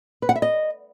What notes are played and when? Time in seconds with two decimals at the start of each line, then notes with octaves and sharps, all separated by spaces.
0.22 B4
0.29 F#5
0.36 E5
0.42 D#5